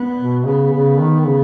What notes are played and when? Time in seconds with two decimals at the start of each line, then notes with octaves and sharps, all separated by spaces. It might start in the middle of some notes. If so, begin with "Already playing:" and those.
Already playing: B3
0.18 B2
0.45 C#3 B3
0.73 C#3
1.00 D#3
1.20 D#3
1.27 C#3